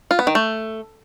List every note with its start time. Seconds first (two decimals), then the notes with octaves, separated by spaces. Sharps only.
0.11 F4
0.19 B3
0.27 D#3
0.35 A3